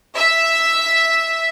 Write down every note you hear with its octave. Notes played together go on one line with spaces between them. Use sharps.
E5